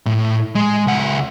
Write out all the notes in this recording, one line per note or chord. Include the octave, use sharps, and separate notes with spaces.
A2
G#3
C#2 F#5